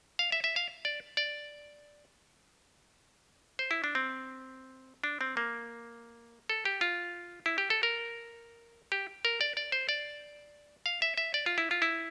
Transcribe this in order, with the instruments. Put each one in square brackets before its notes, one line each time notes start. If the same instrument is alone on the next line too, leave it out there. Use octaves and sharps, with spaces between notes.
[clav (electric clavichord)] F5
E5
E5
F5
D5
D5
C5
E4
D4
C4
D4
C4
A#3
A4
G4
F4
E4
G4
A4
A#4
G4
A#4
D5
D5
C5
D5
F5
E5
E5
D5
F4
E4
F4
E4